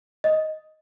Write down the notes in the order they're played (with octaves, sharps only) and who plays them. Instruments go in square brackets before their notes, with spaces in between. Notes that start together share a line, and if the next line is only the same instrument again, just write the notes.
[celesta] D#5